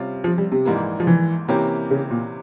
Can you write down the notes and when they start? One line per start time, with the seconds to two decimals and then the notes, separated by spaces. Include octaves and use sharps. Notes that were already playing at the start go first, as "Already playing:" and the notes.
Already playing: C3 G3 C#4 F4
0.24 F3
0.38 G3
0.52 C3
0.65 A#1 G#2 E3 A#3
1.00 F3
1.07 E3
1.48 C3 E3 A#3 C#4 G4
1.91 C#3
2.11 A#2